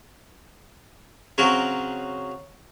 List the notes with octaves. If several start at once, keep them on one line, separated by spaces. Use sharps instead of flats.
C#3 F#3 C4 F#4 A#4